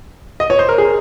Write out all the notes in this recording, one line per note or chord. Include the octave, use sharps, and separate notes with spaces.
D#5
C#5
C5
A#4
G#4